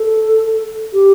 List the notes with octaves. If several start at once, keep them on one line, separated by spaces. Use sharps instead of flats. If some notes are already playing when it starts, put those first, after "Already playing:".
Already playing: A4
G4